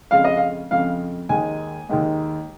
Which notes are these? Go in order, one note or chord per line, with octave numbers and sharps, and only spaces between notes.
F2 C#3 G#3 F5
D#5
F5
F2 C#3 G#3 F5
D#2 D#3 G#3 G#5
D#2 D#3 G#3